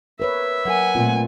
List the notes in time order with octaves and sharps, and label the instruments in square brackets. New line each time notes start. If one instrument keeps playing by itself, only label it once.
[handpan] A#4 B4 C#5 [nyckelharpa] E5
[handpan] F#3 A#4 [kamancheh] F#5 G#5
[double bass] A#2 A3 [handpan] C4 F4